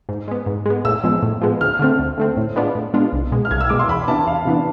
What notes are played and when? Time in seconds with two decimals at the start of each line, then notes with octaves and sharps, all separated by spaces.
0.09 G#2
0.28 G#3 B3
0.46 G#2
0.66 G#3 B3
0.85 A2 E6
1.04 F3 G#3 B3
1.22 A2
1.41 F3 G#3 B3
1.61 D2 F6
1.79 D3 A3 C4
1.99 D2
2.18 D3 A3 C4
2.37 A2
2.56 G#3 B3 D4 F4
2.75 A2
2.94 G#3 B3 D4 F4
3.13 C2
3.32 B2 G#3
3.45 F6
3.51 C2 G#6
3.61 E6
3.69 B2 G#3 D6
3.79 C6
3.88 E2 B5
4.08 C3 E3 B3 D4 A5
4.27 E2 F5
4.45 C3 E3 B3 D4